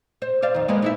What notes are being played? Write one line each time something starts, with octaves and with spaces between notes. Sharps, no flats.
C5
C5 D5 F5
F2 D#3
G#3 A#3 B3
D#4 E4 E5